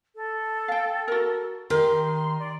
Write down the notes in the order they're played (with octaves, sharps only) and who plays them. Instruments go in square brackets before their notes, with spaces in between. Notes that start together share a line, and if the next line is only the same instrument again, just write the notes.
[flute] A4
[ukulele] F5 G5
F#4 A#4
[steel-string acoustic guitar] D#3 [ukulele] G4 A#4 [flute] C6
[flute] D5